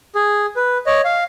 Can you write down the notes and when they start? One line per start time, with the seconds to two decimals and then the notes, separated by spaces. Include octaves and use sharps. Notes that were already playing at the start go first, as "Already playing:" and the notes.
0.15 G#4
0.56 B4
0.86 C#5 D#5
1.05 F5